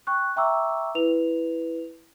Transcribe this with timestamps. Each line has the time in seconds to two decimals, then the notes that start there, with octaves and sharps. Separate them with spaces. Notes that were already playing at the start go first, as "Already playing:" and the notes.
0.07 G5 C#6 F#6
0.36 E5 G5 A#5 C#6 D6 E6
0.95 E4 B4 F7